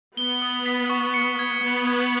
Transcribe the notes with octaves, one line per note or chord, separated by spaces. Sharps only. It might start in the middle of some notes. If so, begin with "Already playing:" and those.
B3 G7
D#6
B6
C#6
C#7
G#6
B3 G#6
G#6